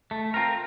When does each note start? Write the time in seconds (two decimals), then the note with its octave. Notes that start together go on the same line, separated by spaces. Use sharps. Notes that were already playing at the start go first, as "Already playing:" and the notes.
0.11 A3
0.34 C4 F4 A#4